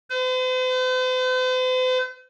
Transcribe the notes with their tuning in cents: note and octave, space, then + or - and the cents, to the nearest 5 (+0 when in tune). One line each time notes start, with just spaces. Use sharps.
C5 -45